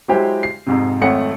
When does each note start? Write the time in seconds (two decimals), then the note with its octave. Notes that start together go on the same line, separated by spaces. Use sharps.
0.08 F#3 G#3 E4 G4 C5
0.43 C7
0.67 F2 G#2 C3
1.01 G#1 F2 A3 C#5 F#5 C#7